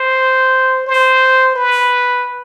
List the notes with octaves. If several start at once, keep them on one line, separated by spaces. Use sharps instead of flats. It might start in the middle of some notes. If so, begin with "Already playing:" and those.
Already playing: C5
C5
B4